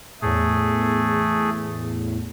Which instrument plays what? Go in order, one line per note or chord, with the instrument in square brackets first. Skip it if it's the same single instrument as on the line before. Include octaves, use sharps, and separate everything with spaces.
[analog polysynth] E2 A2 [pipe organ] A3 G#4